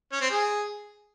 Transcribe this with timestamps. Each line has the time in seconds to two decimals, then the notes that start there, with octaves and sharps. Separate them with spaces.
0.12 C#4
0.21 C4
0.30 G#4